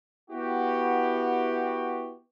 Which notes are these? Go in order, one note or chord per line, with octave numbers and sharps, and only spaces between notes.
B3 E4 F#4 G4